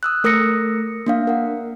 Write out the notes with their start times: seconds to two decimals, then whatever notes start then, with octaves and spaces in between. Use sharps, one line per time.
0.03 D#6 E6 F#6
0.24 A3 A#4 D#6 E6 A#6 C#7
1.06 A#3 D4 F5
1.27 A#4 F#5